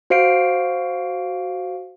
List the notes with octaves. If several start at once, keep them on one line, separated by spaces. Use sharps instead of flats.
F#4 C5 F5 C7 D7